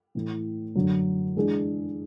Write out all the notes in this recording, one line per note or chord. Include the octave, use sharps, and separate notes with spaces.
A2 E3 A3
F#2 D3 F#3
E3 G#3 D4 G#4